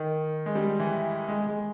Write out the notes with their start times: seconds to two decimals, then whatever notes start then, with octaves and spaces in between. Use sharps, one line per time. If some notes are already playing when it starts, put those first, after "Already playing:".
Already playing: D#3
0.46 G#3
0.55 G3
0.80 E3
1.28 G#3
1.47 G#3